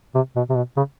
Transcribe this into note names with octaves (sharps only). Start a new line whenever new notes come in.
C3
B2
C3
B2
C#3